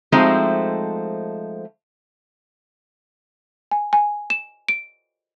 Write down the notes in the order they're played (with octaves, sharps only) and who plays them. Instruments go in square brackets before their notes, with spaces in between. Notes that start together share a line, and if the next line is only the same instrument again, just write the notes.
[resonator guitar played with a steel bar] F3 G#3 A3 C4 D#4 F#4
[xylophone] G#5
G#5
E7
D7